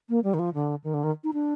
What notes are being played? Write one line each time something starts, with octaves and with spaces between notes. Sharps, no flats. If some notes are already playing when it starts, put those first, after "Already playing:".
A#3
G3
D#3
F3
D3
D#3
D3
D#3
D#4
D4